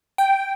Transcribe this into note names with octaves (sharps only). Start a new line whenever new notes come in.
G5